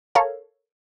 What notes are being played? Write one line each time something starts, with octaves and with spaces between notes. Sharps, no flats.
A4 A#4 C#5 F5